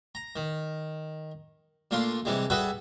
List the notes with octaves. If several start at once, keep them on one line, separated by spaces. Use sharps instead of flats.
A#5
D#3
A#2 A3 D4 F4 C6
C3 E3 G3 G#3
G3 F#4 G#4 A4 B4 E5